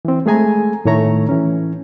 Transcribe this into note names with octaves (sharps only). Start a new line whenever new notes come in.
E3 C4
G#3 A3 G#4 G#5 A#5
A2 D#3 A3 C#5 A#5
E3 C#4